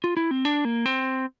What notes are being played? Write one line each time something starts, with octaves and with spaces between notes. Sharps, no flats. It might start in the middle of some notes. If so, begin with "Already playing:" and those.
F4
E4
C4
D4
A#3
C4